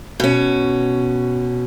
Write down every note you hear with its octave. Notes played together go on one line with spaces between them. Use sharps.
B2 C#4